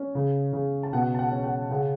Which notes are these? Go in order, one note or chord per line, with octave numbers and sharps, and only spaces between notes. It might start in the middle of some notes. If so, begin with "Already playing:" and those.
Already playing: C#4
C#3
C#3
A5
B2 F#5
A5
F#5
C#4
F#5
C#3 F#5